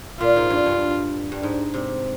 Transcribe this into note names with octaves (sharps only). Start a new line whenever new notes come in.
A#2 F4
G#2
G2
G2
G2
G#2
C3